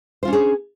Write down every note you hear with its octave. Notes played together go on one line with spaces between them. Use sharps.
C#4 D4 F4 G#4 C5